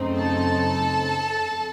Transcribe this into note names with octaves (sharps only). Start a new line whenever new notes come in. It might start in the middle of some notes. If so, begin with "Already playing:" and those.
Already playing: F#2 C#3 A3 C4 D#4
A4 A5
F2